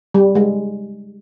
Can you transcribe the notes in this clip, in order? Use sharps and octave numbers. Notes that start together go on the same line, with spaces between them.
G3
G#3